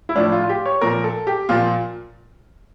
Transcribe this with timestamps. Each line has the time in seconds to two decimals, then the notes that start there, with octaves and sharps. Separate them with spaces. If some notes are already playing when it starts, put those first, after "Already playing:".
0.09 E4
0.15 A2 F3 D4
0.32 F4
0.43 F4
0.49 G4
0.66 C#5
0.81 A#2 F3 A#4
1.04 A4
1.27 G4
1.49 A#2 F3 F4